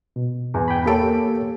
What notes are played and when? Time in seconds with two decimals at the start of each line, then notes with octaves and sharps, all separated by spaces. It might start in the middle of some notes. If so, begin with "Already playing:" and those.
0.16 B2
0.54 E2
0.68 G5 G#5 B5
0.86 A#3 G4 A4 C#5 D7